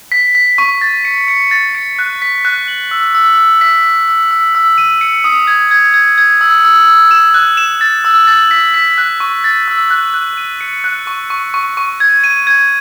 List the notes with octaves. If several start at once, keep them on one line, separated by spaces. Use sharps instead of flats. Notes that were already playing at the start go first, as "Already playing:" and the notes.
B6
B6
C#6
A6
C#7
C#7
A6
C#7
F#6
B6
F#6
F#7
E6
E6
E6
B6
E6
E6
E6
E6
D#7
C#7
D#6
G#6
G#6
G#6
G#6
E6
E6
E6
E7
F#6
E7
A6
E6
A6
B6
B6
F#6
C#6
A6
E6
F#6
F#6
D#7
C#7
F#6
C#6
C#6
C#6
C#6
G#6
D#7
G#6